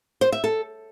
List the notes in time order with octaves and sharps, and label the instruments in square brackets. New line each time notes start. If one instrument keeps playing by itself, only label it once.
[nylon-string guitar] C5
E5
A4